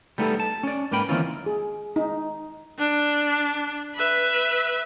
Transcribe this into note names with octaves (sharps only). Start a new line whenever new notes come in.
G3 A3 B3 D#4 F4 A4
A5
C#4 D5
G#2 A#3 B4 G5 B5
D#3 E3 A#3 C4 C#4 F4
G#4
D#4
D4
B4 E5